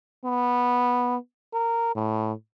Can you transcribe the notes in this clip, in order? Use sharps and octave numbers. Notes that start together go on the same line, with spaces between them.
B3
A#4
A2